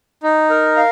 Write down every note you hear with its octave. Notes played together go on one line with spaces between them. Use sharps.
D#4
A#4
F5